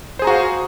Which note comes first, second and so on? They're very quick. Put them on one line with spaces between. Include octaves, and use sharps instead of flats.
C5 G#4 A#5 F#4 F5